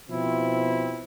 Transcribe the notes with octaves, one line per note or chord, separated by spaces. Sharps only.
B2 F3 C4 E4